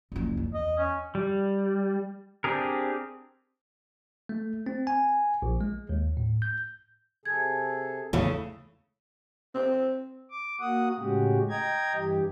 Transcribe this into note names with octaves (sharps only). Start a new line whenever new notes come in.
F#1 C#2
E2
D#5
C#4
G3
C4 D4 G4 G#4 A#4
A3
C4
G#5
A#1
G#3
D#2
A2
G6
C3 G#4 A4 G#6
E2 C#3 E3 A3 E4
C4
D6
A#3 F#4 F#5 D#6
A2 C#3 G#3 F#4 G4
D#5 G5 A#5 G#6
G2 E3 G4